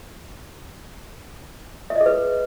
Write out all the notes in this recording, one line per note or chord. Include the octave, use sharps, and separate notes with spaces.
E5
D#5
G#4
B4